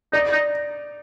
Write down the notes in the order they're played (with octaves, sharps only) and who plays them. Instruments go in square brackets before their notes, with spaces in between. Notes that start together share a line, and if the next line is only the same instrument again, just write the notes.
[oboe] D#4 [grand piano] D5
[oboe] D#4